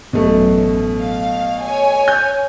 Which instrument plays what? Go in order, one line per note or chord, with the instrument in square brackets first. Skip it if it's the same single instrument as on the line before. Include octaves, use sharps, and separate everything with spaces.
[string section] A1 F#2 [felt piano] B2 A3
[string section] F5
C#5 G#5
[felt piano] G6